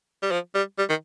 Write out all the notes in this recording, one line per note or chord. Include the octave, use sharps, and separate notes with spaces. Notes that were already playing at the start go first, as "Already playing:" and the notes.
G3
F3
G3
G3
D#3